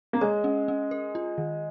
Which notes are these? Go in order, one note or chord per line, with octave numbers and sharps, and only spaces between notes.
A#3
G#3 C#5
C#4
C#4
A#4
F4
D#3